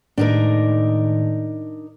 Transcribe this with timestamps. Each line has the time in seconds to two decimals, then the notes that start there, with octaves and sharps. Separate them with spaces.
0.18 A2 D#3 G#3 D4 D#4 A#4